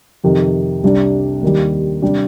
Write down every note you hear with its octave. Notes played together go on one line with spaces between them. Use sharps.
F2 C3 D#3
C2 C3 G3 D4
D#2 D#3 G3
C3 G3 D4